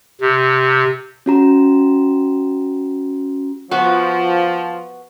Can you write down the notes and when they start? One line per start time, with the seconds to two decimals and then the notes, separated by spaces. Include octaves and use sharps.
0.21 C3
1.26 C#4 F#4 A#5
3.71 F3 B3 F#4